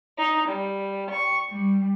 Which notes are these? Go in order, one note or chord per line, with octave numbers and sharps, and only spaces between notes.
D#4
G3
C#6
G3